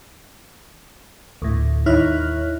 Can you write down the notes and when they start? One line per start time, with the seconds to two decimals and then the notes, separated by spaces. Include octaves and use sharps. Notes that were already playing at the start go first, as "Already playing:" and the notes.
1.42 D2 A2
1.86 D#2 D#4 E4 C#5 F6 F#6